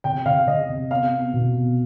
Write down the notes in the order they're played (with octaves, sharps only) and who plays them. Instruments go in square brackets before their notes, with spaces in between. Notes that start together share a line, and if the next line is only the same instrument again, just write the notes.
[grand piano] C3 [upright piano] G5
[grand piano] C3 [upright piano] F5
[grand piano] C3 [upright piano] D#5
[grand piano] C3
[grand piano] B3 [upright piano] F5
[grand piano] B3
B2
B3